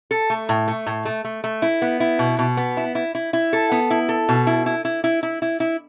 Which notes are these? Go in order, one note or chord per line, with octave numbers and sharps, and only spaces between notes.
A4
A3
A2
A3
A2
A3
A3
A3
E4
B3
E4
B2
B2
B3
E4
E4
E4
E4
A4
B3
E4
A4
B2
E4
E4
E4
E4
E4
E4
E4